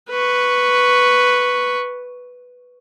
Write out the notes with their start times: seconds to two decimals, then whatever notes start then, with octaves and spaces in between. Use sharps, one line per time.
0.11 B4 C#6